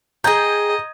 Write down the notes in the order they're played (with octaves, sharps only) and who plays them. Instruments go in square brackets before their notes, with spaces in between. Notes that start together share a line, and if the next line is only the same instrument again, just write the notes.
[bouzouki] G#4 G5 [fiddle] D#5 [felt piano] A#5 G6 G#6